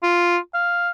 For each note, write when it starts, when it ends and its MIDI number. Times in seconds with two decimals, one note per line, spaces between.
0.03 0.37 65
0.54 0.91 77